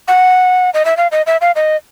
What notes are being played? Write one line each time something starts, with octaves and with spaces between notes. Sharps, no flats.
F#5
D#5
E5
F5
D#5
E5
F5
D#5